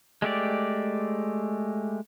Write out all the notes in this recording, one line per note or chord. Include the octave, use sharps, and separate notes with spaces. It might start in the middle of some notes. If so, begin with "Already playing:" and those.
G#3 A3 G4 D5